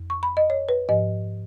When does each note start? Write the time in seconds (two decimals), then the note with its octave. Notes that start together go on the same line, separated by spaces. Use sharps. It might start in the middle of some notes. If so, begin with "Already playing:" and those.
Already playing: F2
0.10 C#6
0.23 B5
0.37 D#5
0.50 C#5
0.69 B4
0.89 G#2 F3 D#5